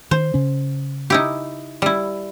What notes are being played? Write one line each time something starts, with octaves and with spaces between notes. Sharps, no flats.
D#3 C5
C#3 C#4
D#4 E4 G4
G3 E4